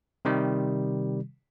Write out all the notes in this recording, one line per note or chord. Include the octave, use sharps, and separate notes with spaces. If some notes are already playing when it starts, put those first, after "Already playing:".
C3 D#3 G3